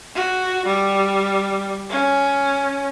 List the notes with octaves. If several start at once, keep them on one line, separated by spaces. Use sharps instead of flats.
F#4
G3
C#4